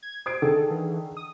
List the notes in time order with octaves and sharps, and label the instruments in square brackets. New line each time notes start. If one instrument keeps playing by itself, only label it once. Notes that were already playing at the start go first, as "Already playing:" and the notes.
[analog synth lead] G#6
[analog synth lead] C5 [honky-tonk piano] D#6 G#6 D7
[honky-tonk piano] D3 D#3 G#4 [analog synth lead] A4
[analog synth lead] E3
D#6